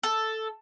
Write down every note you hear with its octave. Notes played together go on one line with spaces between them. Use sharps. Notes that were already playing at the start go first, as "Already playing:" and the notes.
A4